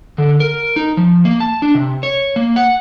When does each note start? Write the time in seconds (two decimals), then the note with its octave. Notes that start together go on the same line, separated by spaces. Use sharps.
0.18 D3
0.40 A#4
0.76 D#4
0.97 F3
1.25 A#3
1.40 A5
1.62 D4
1.75 C3
2.03 C#5
2.36 A#3
2.56 F#5